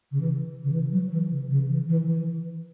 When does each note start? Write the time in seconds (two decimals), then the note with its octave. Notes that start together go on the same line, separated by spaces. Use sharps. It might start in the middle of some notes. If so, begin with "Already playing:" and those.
0.11 C#3
0.20 E3
0.63 C#3
0.72 E3
0.91 F#3
1.11 E3
1.31 C#3
1.50 C#3
1.69 E3
1.88 E3
2.08 E3